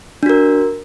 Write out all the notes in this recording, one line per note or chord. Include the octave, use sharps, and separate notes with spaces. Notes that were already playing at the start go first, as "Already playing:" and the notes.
D4 F#4 A#4